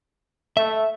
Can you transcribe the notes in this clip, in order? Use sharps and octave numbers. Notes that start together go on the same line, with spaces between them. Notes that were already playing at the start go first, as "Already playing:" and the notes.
A3 E5